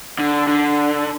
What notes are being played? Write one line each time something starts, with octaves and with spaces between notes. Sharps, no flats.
D3
D3